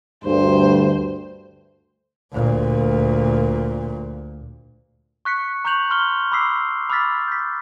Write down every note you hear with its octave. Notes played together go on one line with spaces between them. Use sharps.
D2 G2 C5
D2 A#2
C#6 F#6 B6 C#7
A#5 C#6 F#6 G6 F7 F#7
C6 F6 G7
B5 C6 D6 E6 B6 C7
B5 D6 E6 F6 A6 B6
G6 B6